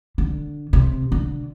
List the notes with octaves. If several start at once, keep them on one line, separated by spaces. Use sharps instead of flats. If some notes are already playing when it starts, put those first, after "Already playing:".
D3
C3
D3